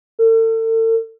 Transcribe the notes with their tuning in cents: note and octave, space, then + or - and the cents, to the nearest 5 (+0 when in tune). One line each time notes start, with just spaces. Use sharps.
A4 +40